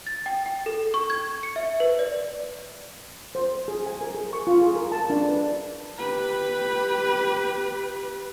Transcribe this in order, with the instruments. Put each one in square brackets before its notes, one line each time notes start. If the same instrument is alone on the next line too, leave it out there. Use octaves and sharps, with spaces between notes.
[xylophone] A6
G5
G5
A4
C#6
G#6
C#7
E5
B4
D5
[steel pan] C5
G#4
G#5
A#4
G#4
C#6
F4
G#4
A#4
A5
D4
B4
[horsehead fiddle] G4 B4